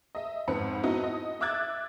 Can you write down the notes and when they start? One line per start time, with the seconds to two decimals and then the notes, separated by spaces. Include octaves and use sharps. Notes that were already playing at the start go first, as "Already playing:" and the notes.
0.15 D#5 E5
0.48 F2 G#2 C4 B4 C#7
0.83 B3 D#4 E4 F#4
1.04 D#5
1.41 E5 D6 E6 F#6 G#6 A6